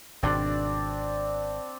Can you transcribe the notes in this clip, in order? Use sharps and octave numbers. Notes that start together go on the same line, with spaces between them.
G#1 B2 C4 D4 D5